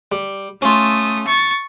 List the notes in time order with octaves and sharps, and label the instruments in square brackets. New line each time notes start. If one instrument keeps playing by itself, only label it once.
[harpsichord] G3
[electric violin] A3 D#6 [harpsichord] C#4 F4
[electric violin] C#6 A6